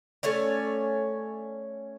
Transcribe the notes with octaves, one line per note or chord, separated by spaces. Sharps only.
A3 C#4 C#5 D5